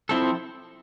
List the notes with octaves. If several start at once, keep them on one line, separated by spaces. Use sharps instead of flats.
F3 C4 E4 A4